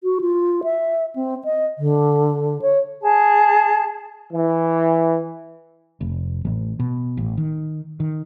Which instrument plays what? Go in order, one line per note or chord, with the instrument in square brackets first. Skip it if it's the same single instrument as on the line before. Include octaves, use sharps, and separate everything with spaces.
[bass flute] F#4
F4
E5
C4
D#5
D3
C#5
[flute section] G#4 A5
[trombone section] E3
[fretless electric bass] F1
A1
B2
A1
D#3
D#3